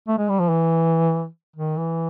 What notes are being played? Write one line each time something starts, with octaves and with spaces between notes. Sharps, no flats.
A3
G#3
G3
F3
E3
D#3
E3